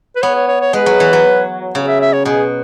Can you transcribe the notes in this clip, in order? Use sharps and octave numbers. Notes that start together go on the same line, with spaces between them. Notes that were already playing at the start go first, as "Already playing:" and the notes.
B4
B3 C#5
C#5
C#5
C#5
G#3 B4
F#3
E3
F#3
C#3 C#5
E5
E5
C#5
B2 G#4